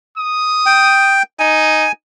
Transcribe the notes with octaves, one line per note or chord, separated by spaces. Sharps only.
D#6
G5
D#4 G#5